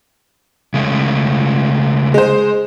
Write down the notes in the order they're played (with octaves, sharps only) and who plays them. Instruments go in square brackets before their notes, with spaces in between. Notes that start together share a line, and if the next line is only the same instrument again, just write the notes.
[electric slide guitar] C#3 G#3 A3
[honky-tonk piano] G#3 C5